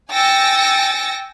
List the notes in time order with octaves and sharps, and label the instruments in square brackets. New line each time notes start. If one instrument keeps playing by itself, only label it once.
[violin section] G5 G#5 E6 A6 A#6 C#7